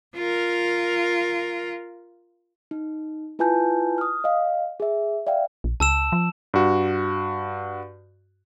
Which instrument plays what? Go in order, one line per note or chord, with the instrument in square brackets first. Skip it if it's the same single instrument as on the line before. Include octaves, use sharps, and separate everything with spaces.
[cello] F4 A#4
[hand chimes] D#4
E4 F4 B4 G#5 A5 G6
D#6 F6
D#5 F5
G#4 E5
D5 E5 F5 G5
[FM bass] A#1
[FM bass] C#2 [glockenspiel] A5 E6 E7
[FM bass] F3
[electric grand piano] G2 F#4